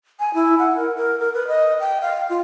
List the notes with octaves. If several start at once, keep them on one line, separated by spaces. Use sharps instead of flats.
G#5
E4
F#5
A#4
A#4
A#4
B4
D#5
G5
F5
F4